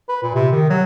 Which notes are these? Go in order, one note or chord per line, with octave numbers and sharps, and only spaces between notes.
B4
A#2
C3
D#3
F#3